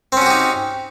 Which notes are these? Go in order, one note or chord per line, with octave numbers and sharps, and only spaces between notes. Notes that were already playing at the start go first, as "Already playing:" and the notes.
C4 C#4 D#4 F#4 G4